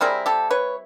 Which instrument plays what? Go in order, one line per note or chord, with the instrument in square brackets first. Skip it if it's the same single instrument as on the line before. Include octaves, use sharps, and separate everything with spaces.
[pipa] G3 C4 E4 G#4 A#4
G4 A4
B4 C#5